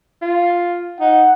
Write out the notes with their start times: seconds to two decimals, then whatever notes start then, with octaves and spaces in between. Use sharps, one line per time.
0.22 F4
1.00 D#4 F#5